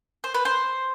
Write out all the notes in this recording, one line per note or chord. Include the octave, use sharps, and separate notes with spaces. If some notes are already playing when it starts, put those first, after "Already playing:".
C5
B4
C5